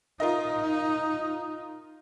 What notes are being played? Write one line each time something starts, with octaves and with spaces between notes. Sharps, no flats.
D#4 F4 A#4 D#5